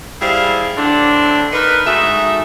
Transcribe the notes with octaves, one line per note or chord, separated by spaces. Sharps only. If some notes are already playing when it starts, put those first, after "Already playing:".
G3 E4 G#4 C5 F5
A2 D3 C4 D4
D#4 A#4 B4
G#2 A3 D#4 F#4 E5